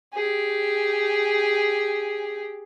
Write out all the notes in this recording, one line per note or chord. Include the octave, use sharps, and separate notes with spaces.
G4 G#4